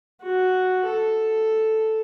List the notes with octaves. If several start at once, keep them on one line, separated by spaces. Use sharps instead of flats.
F#4
A4